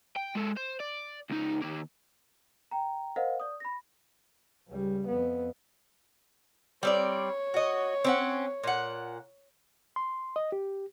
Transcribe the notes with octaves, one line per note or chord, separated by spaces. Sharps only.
G5
G#3 A4
C5
D5
C#2 D#4
D#3 A#3
G5 A#5
A#4 C5 D#5 F5 F#5
D5 D#6
B5 A#6
C#2 G3
F2 B3
G3 C4 C#5 D5
F#4 D#5
C4 C#4 F#5
A#2 F#5
C6
D#5
G4